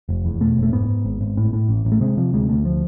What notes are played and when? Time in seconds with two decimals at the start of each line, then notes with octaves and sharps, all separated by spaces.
0.09 F1
0.25 E2
0.41 B2 A3
0.57 F1
0.63 A3
0.73 G#2 B3
0.89 G#2
1.05 G#1
1.21 G#1
1.37 A2
1.53 A2
1.69 A1
1.85 A1
1.92 A3
2.01 C3 G#3
2.17 C3 F3
2.33 D2 G#3
2.49 D2 A3
2.65 F3